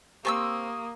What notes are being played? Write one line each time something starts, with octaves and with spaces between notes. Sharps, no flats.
A#3 C4 G4 A5 C#6 D#6 E6